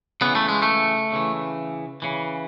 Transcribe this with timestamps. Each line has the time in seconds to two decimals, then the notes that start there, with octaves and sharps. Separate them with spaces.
0.21 C#3 E3 B3
0.35 A3
0.49 G#3
0.62 A3
1.12 C#3 E3
2.02 C#3 E3